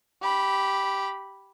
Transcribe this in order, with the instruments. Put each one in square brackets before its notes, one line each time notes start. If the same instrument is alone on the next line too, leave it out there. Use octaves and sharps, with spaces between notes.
[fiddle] G4 B5